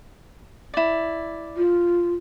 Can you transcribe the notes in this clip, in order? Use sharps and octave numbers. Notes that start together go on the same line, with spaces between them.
E4 D5
F4